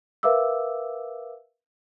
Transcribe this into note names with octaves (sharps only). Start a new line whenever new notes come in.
A#4 B4 E5 F5 D6 E6